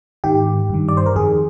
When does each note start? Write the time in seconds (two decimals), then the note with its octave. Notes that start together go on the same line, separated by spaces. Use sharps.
0.24 G#2 D#3 G4
0.70 G2 D#3
0.88 D5
0.97 C5
1.06 A#4
1.16 F2 D#3 G#4